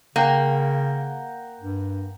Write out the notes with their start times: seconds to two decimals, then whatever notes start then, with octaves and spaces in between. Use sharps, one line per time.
0.16 C#3 A#3 F#5 G5
1.61 G2